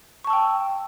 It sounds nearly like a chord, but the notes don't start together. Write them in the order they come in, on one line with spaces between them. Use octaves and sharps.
C#6 A5 E6 G5